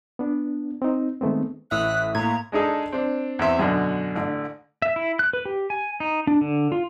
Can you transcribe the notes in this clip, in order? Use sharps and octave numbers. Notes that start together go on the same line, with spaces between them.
B3 D4
C4 D#4
D#3 G#3 A3 B3 C4
A1 A2 E5 D#6 E6 F#6
A2 A#3 A#5 G#6
G#3 D4 D#4 G#4 A4
C4 D4
E2 C4 E5 C6
F#2 B2 D3
A1 D3
E5
E4
F#6
B4
G4
G#5
D#4
D4
D3
F4